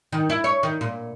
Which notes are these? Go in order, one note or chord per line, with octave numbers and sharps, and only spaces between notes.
D#3
E4
C#5
D#3
A#2